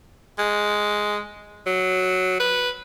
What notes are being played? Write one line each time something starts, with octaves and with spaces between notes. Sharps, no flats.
G#3
F#3
B4